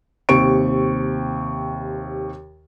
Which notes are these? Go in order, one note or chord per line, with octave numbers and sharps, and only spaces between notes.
D#2 C3 C4 C#6 D7